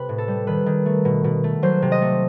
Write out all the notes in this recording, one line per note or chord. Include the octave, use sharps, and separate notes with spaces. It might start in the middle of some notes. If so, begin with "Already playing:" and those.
Already playing: C3 A3 B4
A2
A4
G3
D#3 B4
D#3
A3
B2
B2
A3
F#3 C5
C3
D#5
A3